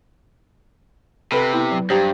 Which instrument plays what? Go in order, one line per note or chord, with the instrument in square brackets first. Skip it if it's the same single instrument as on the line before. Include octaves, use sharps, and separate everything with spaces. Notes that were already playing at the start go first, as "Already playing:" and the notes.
[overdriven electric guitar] C3 [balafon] A4 [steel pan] B4 B5
[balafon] B3 E4
F#3
[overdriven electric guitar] G2 [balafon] G4 [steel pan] C5 G5 A#5